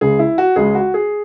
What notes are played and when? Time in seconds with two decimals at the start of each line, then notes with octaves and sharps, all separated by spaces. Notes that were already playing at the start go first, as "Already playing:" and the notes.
0.01 C#2 C#3 G#3 G#4
0.19 E4
0.38 F#4
0.56 C#2 C#3 G#3 G#4
0.75 F#4
0.94 G#4